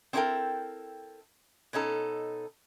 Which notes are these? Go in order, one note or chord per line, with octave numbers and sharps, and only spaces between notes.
C4 D4 E4 A4 A#4 G5
B2 C#4 D#4 A4